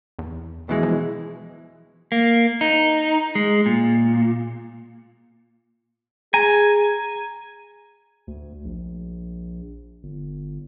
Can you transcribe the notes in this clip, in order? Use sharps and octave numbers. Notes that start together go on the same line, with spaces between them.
E2
B2 E3 G#3
F3
A#3
D#4
G#3
A#2
G#4 G#5 A#5
D2
A#1
G1